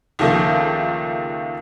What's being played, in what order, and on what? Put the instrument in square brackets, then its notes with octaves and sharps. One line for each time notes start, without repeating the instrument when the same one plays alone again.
[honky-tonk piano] C#2 D#3 F3 A3 A#3